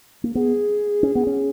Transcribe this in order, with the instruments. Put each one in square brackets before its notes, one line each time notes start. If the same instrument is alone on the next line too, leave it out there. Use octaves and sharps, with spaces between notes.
[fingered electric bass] A#3
[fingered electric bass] B3 [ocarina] G#4
[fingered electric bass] C#4
B3
C#4